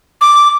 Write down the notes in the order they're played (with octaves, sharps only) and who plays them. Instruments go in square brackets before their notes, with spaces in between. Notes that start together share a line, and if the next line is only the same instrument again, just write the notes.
[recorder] D6